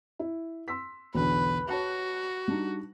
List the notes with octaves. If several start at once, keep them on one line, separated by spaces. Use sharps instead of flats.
E4
C6 E6 B6
B1 E2 D3 B4
F#4 C#5 A5 F#6
G3 D4 D#4